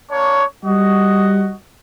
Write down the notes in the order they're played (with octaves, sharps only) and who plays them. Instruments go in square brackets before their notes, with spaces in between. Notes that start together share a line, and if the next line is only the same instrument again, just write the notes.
[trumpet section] A#3 D4 C#5
[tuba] G3 [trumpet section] F#4 D#5